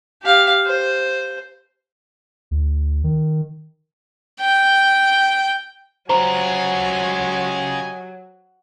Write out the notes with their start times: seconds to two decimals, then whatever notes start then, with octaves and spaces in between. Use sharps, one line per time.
0.23 G4 F5
0.66 C5
2.51 D2
3.04 D#3
4.40 G5
6.09 C#3 F#3 F4 G4 C5 D#5 G#5 A#5